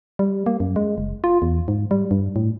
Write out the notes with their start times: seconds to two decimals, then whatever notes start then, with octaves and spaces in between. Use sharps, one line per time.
0.19 G3
0.46 A#3
0.60 F#2
0.76 G#3
0.98 F#1
1.24 F4
1.42 E2
1.68 G#2
1.91 G3
2.11 G2
2.36 A2